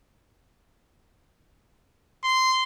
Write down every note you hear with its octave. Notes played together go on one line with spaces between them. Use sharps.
C6